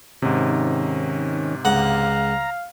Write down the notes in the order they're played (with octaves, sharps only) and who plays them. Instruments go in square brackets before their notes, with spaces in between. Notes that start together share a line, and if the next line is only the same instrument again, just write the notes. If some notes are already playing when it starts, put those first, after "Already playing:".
[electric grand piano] G#2 C3 [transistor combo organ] D#3 C#4
[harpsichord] C#2 F#5 [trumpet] F5 [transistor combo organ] A#5